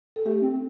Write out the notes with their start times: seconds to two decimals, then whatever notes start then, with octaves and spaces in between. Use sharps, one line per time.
0.16 A4
0.25 A3 G4
0.42 C4